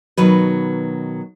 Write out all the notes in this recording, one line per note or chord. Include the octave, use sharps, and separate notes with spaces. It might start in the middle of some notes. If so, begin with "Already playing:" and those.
B2 D#3 F#3 B4